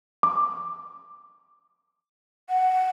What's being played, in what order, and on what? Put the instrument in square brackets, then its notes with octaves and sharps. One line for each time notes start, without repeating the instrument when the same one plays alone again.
[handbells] D6
[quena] F#5